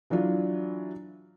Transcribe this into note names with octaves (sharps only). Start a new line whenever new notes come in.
E3 F#3 D4 F4